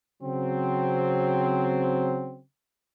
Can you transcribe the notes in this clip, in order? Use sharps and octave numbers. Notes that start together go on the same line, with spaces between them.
C#3 F#3 C4